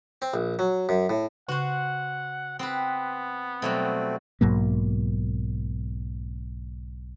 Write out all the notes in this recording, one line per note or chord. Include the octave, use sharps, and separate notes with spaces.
C4
A#1
F#3
F#2
A2
C#3 F#4 C5 F#5
B3 C4 B4
B2 F#3 G3 A3 C4
B1 G#2 F#3 A#3